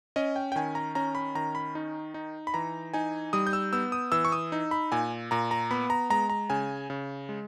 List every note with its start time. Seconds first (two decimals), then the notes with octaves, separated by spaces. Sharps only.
0.16 C#4 D#5
0.36 G5
0.52 G5
0.56 D#3 G#5
0.75 A#5
0.95 C#4 A#5
1.15 B5
1.35 D#3 A#5
1.55 B5
1.75 D#4
2.14 D#4
2.47 B5
2.54 E3 A#5
2.94 D#4 G#5
3.33 G3 D#6
3.47 G6
3.53 E6
3.73 B3 E6
3.92 D#6
4.12 E3 E6
4.25 C#6
4.32 D#6
4.52 D#4
4.71 B5
4.92 A#2 G#5
5.31 A#2 A#5
5.51 A#5
5.71 B3 B5
5.90 A#5
6.10 G#3 A#5
6.30 A#5
6.50 C#3 G#5
6.90 C#3
7.29 G#3